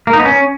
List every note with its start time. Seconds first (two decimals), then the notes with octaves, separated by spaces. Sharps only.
0.07 A#3
0.13 D#4
0.19 B3
0.25 C#4